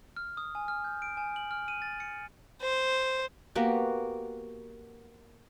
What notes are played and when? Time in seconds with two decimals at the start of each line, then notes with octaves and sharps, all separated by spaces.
0.16 F6
0.37 D#6
0.55 G#5
0.68 F6
0.84 G6
1.02 D7
1.17 G#5
1.36 F#7
1.51 F6
1.68 D#7
1.82 A6
2.00 C#7
2.61 C5
3.55 A#3 B3 F#4 G4